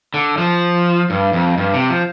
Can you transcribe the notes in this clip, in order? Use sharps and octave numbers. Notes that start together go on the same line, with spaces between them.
D3
F3
G2
F2
G2
C3
F3